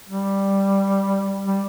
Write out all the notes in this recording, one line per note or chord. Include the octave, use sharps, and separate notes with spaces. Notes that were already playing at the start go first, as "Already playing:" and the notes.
G3
G3